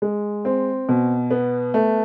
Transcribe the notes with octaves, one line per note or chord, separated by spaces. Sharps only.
G#3
C4
B2
B3
A3